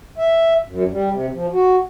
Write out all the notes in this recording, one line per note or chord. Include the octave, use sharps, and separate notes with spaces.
E5
F#2
G3
C3
F3
F#4